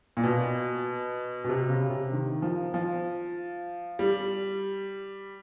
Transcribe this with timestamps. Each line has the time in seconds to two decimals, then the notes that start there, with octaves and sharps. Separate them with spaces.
0.17 A#2
0.23 B2
1.44 B2
1.49 C3
1.70 C#3
1.90 C3
2.12 D#3
2.42 F3
2.74 F3
3.99 G3